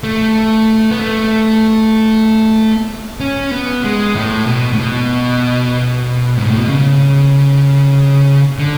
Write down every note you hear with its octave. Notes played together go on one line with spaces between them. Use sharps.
A3
B3
A3
C#4
B3
G#3
A2
B2
A2
B2
G#2
A2
B2
C#3
D3